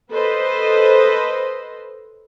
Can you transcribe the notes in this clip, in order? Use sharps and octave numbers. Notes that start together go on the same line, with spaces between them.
A4 B4 C5 D#5